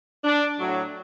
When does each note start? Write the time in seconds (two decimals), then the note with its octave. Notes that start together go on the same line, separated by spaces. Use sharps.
0.24 D4
0.58 A2 F#3